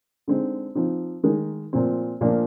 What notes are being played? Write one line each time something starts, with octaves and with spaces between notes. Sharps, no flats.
D3 G#3 C4 D#4
F3 C4 D#4
D#3 G#3 D#4 A#4
A#2 F3 C4
A#2 F3 A#3 D4